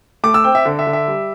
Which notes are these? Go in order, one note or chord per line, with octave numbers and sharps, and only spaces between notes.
A3 D6
E6
C4 G5
E5
D3
E5
D3
E5
G3